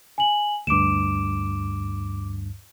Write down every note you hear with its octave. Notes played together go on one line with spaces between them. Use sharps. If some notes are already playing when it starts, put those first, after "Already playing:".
G#5 F#7
D2 G2 D6 D7 E7